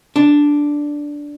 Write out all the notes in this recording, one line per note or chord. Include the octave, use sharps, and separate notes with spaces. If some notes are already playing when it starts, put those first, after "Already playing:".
D4